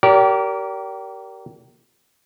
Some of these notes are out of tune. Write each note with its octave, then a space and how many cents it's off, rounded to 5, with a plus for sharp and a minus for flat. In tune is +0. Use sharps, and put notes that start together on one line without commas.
G4 -25 A#4 +0 D5 -40